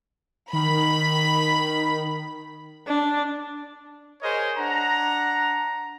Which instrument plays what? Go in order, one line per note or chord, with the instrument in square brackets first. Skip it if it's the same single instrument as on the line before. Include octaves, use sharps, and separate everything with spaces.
[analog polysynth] D#3 [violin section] B5
[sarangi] D4
[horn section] G#4 A#4 C5 C#5 D#5
D4 F#5 A#5